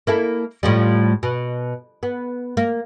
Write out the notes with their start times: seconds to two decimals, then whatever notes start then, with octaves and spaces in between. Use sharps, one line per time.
0.07 A#3 E4 A4
0.63 A2 F3 G3
1.23 B2
2.03 B3
2.57 A#3